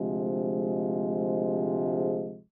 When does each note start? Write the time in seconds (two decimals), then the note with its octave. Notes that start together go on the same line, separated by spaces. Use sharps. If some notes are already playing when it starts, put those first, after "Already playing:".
Already playing: D2 C3 F3 G#3